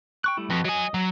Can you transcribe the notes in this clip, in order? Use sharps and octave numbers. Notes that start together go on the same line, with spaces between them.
G5 C#6 F#6
G3 A3 E4
F2 F#4 B4
F#3 D#5 G#5 D#6
F#3